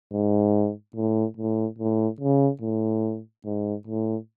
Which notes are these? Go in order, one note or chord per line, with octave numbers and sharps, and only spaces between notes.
G#2
A2
A2
A2
C#3
A2
G#2
A2